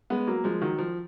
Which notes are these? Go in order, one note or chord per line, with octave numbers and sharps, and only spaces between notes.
G#3 B3
F#3 A#3
F3 G#3
D#3 F#3
F3